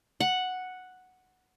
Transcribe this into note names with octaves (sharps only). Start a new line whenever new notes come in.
F#5